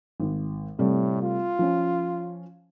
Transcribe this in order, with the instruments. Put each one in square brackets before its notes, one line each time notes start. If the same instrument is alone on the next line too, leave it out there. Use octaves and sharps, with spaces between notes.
[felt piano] G#1
[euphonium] A2 [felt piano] C3 G3 A3
[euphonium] F4
[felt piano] F3 C#4